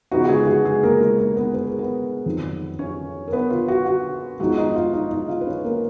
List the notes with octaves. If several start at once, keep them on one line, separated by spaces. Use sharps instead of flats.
C#3 F3 B3 D#4 F#4
F#4
G#3 G#4
G#4
F#4
G#3 G#4
A#3 A#4
G#3 G#4
A#3 A#4
B3 B4
B4
A#4
B3 B4
F2 D#3 F#3
C#4 C#5
A#4
B3 B4
F4
F#4
F#4
G#2 F3 B3 D#4 F#4
D#4 D#5
F4 F5
D#4 D#5
D#4 D#5
F4 F5
B4
C#4 C#5
A#3 A#4